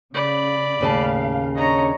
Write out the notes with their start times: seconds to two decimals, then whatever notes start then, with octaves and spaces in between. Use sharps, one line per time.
0.14 C#3 D5 B5
0.81 D#2 A2 C#3 F5 A5
1.55 D4 C#5 D#5 A#5